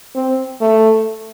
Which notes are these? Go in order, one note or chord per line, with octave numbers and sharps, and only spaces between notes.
C4
A3